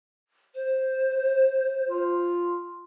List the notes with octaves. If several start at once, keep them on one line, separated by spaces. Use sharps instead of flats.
C5
F4